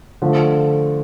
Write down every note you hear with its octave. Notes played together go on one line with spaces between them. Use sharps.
D3 F3 A3